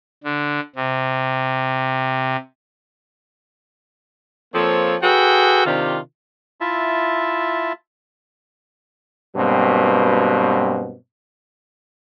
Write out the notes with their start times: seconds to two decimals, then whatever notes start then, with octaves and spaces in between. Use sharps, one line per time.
0.24 D3
0.75 C3
4.54 F3 A#3 C4 A4 C#5
5.03 F#4 G#4 A4 B4 G5
5.66 C3 D#3 D4 F4 G4
6.61 E4 F4 E5 A5
9.36 G2 B2 F#3 A#3 C4